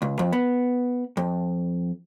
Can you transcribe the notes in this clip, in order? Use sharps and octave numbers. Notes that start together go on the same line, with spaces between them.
C#2
F2
B3
F2